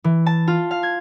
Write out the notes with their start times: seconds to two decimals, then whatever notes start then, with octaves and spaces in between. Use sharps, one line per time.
0.04 E3
0.26 A5
0.48 F4
0.71 F5
0.83 G#6